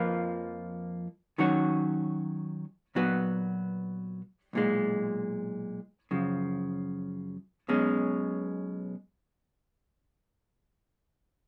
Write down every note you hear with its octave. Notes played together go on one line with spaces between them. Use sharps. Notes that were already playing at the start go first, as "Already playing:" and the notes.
Already playing: F2 F3 A#3 F4 B4
D#3 F#3 C#4 F#4 C#5
A#2 F#3 B3 F#4 B4
B1 A#2 G#3
F#2 C#3 F3
B1 B2 G#3 C#4